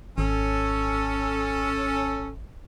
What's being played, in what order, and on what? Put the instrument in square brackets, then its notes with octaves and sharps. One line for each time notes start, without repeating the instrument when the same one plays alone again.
[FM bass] G#1 [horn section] C#4 A4